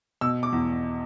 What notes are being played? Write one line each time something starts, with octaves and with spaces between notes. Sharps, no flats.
B2 E6
D6
E2